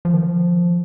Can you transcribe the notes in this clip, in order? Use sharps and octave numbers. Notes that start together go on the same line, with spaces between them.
F3
D#3
F3